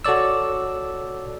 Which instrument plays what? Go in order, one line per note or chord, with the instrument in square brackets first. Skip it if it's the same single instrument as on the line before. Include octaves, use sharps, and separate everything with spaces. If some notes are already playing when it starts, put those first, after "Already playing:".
[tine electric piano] F#4 A4 C#5 D5 E6